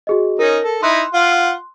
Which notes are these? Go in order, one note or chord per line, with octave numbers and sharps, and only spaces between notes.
F#4 G#4 D#5
C#4 D#4 A#4 A#6
A4
D#4 E4 C6 F#6
F4 F#5